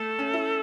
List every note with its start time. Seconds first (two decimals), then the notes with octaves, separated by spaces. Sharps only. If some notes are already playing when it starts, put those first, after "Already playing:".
Already playing: A3 A4
0.19 C#4
0.33 E4